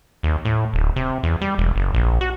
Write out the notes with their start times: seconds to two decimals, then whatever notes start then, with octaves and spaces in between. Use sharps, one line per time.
0.23 D#2
0.45 A2
0.74 D1
0.96 C3
1.23 E2
1.41 G3
1.58 E1
1.76 F#1
1.94 A#1
2.21 F#4